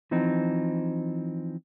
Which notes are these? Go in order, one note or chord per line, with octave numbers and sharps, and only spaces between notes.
E3 F3 C4 D#4